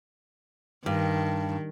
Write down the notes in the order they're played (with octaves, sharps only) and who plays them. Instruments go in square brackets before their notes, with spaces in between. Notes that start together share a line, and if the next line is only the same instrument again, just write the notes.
[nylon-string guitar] G2 [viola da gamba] D#3